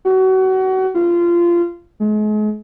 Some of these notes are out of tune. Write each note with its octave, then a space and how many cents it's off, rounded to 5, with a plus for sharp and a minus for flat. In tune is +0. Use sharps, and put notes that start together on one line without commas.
F#4 +30
F4 -20
G#3 +40